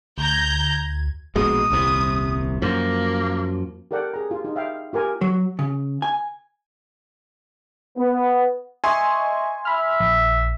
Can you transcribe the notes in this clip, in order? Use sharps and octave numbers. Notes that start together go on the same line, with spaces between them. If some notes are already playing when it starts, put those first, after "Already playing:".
D2 A#5 G6 G#6
A#1 B2 G#3 D#6
D#1 C2 C3
F#2 F3 A#3
G4 A4 A#4 D5 F#5 G5
G#4 A#5
F4 G4
D#4 F4
E5 F5 G5
F4 G4 A#4 G#5
F#3
C#3
G#5
B3
D#5 E5 G#5 C6 C#6
E5 B5 F6
A#1